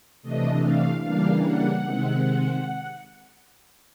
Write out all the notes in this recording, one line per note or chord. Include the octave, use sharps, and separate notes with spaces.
C3 E3 A3 D4 D#5
F5
C#3 E3 G3 A#3 D4 F5
F#5
C3 D#3 G#3 C4